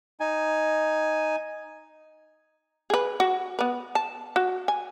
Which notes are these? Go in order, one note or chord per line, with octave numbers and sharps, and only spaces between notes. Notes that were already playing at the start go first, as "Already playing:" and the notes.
D#4 G#5
G#4 B4
F#4
B3 B4
A5
F#4
G#5